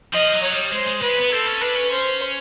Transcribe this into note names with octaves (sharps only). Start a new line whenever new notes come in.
F3 D#5
F#3
C#5
G3
G#3 C5
G#3
G#3 B4
B3
C4 A4
C#4
D4 B4
C#4
C5